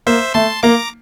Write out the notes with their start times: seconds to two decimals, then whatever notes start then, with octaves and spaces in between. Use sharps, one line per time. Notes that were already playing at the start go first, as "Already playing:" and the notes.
0.06 A#3 C5 E5
0.34 A3 A5 C6
0.63 A#3 A#5 D6